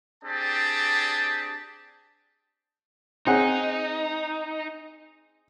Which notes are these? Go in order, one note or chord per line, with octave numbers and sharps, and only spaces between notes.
C4 D4 G4 G#4 D5 A5
C4 D#4 G#4 F#5